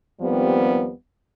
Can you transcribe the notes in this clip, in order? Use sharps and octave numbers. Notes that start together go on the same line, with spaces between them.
D#2 F3 G3 B3 C4